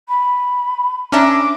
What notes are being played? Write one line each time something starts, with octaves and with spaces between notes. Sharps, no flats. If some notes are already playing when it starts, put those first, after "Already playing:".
B5
C#4 D4 A#4 E5 A#5 D6